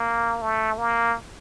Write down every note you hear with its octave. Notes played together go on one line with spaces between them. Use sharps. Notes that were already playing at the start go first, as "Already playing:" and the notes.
Already playing: A#3
A3
A#3